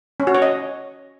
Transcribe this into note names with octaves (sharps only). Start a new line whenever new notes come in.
C#4
F#4
C#5
D#5